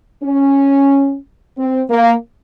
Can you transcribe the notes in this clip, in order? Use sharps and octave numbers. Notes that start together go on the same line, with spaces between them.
C#4
C4
A#3